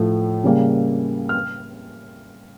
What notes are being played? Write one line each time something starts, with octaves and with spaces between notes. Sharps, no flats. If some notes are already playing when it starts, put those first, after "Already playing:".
Already playing: A2 F3 A3
C#3 G3 A#3
F6